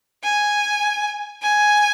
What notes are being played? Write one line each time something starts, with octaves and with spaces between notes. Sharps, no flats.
G#5
G#5